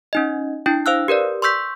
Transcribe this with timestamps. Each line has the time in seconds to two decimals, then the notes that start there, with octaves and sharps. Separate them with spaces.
0.13 C#4 D#4 D#5
0.66 D4 E4 G5
0.86 C5 F5 E6 F#6
1.08 G4 A#4 B4 D5
1.42 C6 C#6 E6 G6 B6